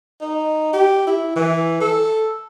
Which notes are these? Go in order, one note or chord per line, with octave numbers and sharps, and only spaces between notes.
D#4
G4
E4
E3
A4